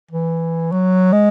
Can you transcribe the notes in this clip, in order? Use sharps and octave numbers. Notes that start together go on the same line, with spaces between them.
E3
F#3
G#3